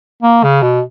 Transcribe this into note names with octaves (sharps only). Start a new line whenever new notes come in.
A#3
C#3
B2